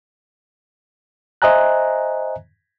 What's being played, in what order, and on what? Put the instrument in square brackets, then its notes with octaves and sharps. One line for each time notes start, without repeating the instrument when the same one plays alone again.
[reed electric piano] C5 D#5 E5 G#5 A#5 F#6